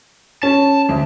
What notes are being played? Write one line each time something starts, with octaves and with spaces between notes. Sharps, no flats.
C#4 A5
D2